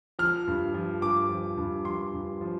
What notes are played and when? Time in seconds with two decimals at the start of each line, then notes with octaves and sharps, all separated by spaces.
0.19 F3 F6
0.47 G2
0.74 F3
1.02 G2 D6
1.29 F3
1.57 G2
1.85 F3 C6
2.13 G2
2.41 F3